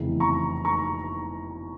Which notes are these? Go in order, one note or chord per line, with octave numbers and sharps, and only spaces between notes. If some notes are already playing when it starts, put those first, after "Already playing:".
Already playing: F1 E2 C#3 E3
A#5 C#6
A#5 C#6